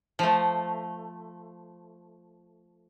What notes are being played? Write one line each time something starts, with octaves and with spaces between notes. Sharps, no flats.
F3 A3